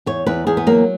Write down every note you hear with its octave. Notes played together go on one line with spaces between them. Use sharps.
E2 C#5
E2 B4
E2 G#4
B3
F#3 A#3